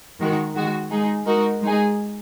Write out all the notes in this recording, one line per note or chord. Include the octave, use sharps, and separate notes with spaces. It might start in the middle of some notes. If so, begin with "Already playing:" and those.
D#3 G#3 F#4 A#4
D#3 G#3 F#4
G#3 D#4 G#4
G#3 D#4 F#4 A#4
G#3 D#4 G#4